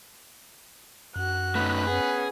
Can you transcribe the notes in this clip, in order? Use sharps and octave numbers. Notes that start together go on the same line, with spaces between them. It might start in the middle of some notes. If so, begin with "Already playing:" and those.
F#2 F#4 F#6
A3 C#4 D#4 B4
B3 C#4 G#4